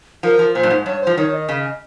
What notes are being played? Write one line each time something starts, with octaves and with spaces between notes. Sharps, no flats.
F3 A#4
F3
A#2 C5
G2
G#2
G2 C#5
C5
F3
D#3 C#5
D#5
C#3 D#5